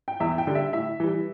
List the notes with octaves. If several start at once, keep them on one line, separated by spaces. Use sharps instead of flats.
G5
E2 E5
G5
D3 G3
E5
A2 E5
E3 G3